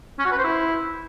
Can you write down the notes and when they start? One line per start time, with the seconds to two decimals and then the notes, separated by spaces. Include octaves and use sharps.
0.19 C#4
0.25 F#4
0.32 B4
0.38 C5
0.44 E4